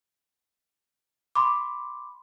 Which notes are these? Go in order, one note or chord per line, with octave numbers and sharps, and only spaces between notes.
B5 C6 D6